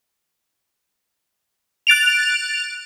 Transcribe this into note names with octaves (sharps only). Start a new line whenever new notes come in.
F#6 A6 D7 F7